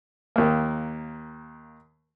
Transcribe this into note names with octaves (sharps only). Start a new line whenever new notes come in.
D#2 A#3